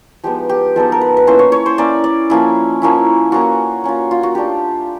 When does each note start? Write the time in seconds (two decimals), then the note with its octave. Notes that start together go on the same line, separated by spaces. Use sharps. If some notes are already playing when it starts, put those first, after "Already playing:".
0.24 F3 G#3 B3 D#4 G4
0.49 G4
0.76 F3 G#3 B3 D#4 A4
0.92 A#4
1.01 B4
1.17 B4
1.27 A#3 C#4 E4 C5
1.39 C#5
1.52 C#5
1.66 C5
1.78 A#3 C#4 E4 D5
2.04 D5
2.30 F3 A#3 C#4 E4
2.82 F3 A#3 C#4 E4
3.32 A#3 C#4 F4 F#4
3.84 A#3 C#4 F4
4.11 F4
4.23 F#4
4.35 A3 D4 F4 G4